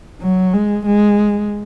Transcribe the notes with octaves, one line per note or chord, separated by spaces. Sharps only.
F#3
G#3
G#3